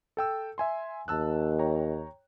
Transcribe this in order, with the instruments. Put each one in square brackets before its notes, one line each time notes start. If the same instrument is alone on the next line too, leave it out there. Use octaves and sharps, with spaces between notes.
[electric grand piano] A4 G5 E6
E5 G#5 C6
[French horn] D#2 [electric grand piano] A5 E6 F#6
[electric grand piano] C#5 G5 A#5